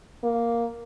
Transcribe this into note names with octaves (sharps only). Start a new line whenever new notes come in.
A#3